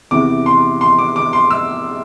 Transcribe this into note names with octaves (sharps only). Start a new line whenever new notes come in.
E2 C3 E3 D6
C6
C6
D6
D6
C6
E6